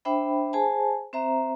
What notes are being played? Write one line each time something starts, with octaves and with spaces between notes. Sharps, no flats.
D4 C5 E5 G5 B5
G#4 C5 G#5 A5
C4 C5 E5 A#5